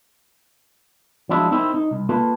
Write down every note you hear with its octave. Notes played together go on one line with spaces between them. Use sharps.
F3 F#3 G#3 D4 E4 F4
C4 D#4 E4 A#4 C5
D#4
C2
A#3 F4 A4 B4